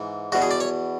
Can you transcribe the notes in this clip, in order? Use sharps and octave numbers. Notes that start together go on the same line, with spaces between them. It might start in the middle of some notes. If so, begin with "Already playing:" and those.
Already playing: G#2 E3
E2 B2 F#4
G#4
D5
C#5